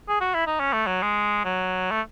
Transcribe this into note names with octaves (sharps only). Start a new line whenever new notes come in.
G#4
F#4
E4
D#4
C#4
A3
F#3
G#3
F#3
A3